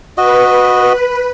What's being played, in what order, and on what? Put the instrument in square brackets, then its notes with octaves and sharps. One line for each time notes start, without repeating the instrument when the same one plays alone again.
[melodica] F#4 D#5 [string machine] B4